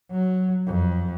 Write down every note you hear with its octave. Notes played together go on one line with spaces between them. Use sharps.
F#3
F2